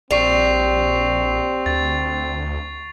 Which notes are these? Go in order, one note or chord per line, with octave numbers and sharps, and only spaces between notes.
A#1 G3 C4 C#6 C7 F7
D2 A6